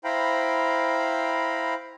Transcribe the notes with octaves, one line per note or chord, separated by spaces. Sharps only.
E4 C5 F5 G5 A#5 B5